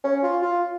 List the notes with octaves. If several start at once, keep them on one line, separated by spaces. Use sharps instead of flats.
C#4
F4
F4